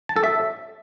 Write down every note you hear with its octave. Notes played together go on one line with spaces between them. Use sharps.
A5
A4
E5